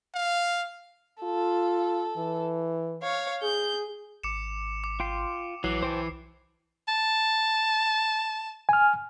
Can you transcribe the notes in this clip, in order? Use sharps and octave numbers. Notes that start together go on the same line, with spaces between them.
F5
F4 A4
E3
C#5 F5
G#4 G6
G#1 D6 C#7 E7
D6
F4 G5 C6
A#1 E3 F#3 C7
B1 C5 G5 A5
A5
G#5 F6